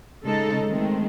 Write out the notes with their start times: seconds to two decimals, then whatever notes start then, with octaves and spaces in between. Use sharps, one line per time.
0.25 C#3 G#3 D#4 A4
0.67 D#3 G#3 A3 C4